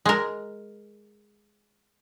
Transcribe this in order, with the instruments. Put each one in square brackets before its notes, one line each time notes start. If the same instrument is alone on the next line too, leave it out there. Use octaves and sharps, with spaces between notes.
[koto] G#3 A#4